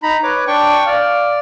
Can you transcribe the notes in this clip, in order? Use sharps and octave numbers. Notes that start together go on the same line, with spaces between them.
D#4 A#5 B5
B4 C#5 D6
D4 G5 C#6
D5 F5